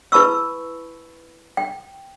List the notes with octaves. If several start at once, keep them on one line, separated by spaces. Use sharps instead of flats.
E4 B4 A5 B5 C#6 E6
G5